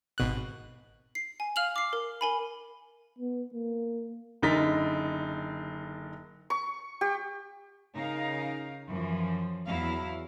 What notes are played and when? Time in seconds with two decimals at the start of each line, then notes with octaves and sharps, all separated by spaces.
0.18 G#1 B2 F#6
1.15 C7
1.40 G#5
1.56 F5 F6 F7 F#7
1.76 D6 C7
1.93 A#4
2.21 A#4 G#5 B5
3.19 B3
3.53 A#3
4.42 F#1 D3 D#4 A#4 A6 B6
6.50 C#6
7.01 G4
7.95 C#3 D#4 A#4 F5
8.88 F#2 E3 F3
9.67 E2 F#3 E4 F5